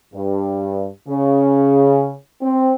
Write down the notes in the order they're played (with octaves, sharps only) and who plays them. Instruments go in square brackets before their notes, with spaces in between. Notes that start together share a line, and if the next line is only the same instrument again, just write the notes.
[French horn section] G2
C#3
C4